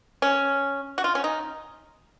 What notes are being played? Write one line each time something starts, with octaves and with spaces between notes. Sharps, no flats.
C#4
F#4
F4
C#4
D#4